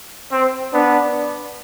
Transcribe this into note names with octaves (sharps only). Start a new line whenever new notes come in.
C4 C5
B3 D4